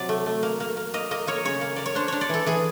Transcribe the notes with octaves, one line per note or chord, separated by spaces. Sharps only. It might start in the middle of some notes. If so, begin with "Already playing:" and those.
Already playing: C3 F#3 D5
A3
A3
A#3
A#3
A#3
A#3 D#5
A#3 D#5
A#3 C#5
C#3 C#5
A#3
A#3 D5
C#5
D4 C5
D4 C#5
D5
E3 A4
E3 G#4